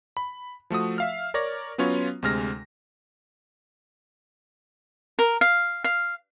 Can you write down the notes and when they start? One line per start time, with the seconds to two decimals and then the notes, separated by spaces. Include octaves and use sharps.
0.17 B5
0.70 F3 A3 F#4 D#6
0.98 E5 F5 F6
1.34 A#4 C#5 D5 A#6
1.78 F#3 B3 C#4 F4 C#5
2.22 D2 C3 G#3 F6 A#6
5.19 A#4
5.41 F5
5.84 F5